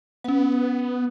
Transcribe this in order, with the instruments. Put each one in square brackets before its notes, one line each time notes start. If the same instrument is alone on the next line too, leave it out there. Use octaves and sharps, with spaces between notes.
[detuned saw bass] B3 [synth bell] C#4 F#5